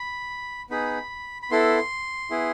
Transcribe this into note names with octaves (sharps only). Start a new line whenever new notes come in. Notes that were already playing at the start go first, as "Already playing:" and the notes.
Already playing: B5
B3 D#4 G#4 B5
B5
B3 E4 A4 C6
B3 E4 G#4